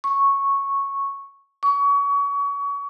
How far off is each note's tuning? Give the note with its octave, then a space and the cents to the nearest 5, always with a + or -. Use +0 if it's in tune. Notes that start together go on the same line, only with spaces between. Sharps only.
C#6 -5
C#6 +30